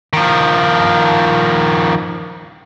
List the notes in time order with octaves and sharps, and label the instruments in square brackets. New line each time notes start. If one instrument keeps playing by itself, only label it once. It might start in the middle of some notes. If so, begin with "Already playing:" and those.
[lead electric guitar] D#3 F3